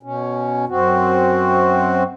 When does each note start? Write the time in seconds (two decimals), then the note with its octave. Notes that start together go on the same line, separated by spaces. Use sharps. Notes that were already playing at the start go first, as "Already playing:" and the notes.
0.03 B2 C#4
0.69 F#2 C4 F#4